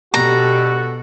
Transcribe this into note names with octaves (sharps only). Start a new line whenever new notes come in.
D2 B2 G3 F#4 G4 A4 A#5